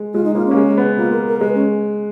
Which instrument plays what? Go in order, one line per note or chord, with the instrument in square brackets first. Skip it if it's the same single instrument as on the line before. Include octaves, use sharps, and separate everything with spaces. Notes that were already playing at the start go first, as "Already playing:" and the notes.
Already playing: [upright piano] G#3
[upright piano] G#3 [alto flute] F4
[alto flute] D#4
[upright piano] A#3 [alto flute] F4
[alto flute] C#4
[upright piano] A#3
G#3
B3
[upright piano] A#3 [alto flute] F4
[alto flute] A#4
A#4
[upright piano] G#3 [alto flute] B4
[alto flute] C#4